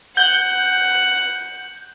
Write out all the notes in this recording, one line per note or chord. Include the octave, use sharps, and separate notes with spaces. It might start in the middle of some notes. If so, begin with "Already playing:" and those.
F#5 G6